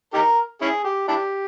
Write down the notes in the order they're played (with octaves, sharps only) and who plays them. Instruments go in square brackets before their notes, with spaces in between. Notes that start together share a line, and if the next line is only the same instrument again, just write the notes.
[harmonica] D#4 G4 A#4
C#4 E4 G#4
G4
D4 E4 G4